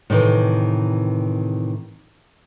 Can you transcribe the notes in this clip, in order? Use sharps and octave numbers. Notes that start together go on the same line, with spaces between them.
A2 C3 D#3 E3